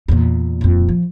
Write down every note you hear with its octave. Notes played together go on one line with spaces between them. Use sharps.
E2 A#2
D#1 F2
F3